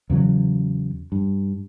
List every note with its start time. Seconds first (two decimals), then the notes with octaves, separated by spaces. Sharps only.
0.10 E2 C#3 F#3
1.12 G2